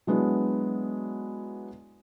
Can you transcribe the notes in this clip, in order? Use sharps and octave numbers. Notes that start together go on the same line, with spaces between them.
F#3 G#3 B3 D4 E4